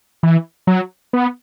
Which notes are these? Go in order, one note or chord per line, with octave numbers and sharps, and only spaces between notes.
E3
F#3
B3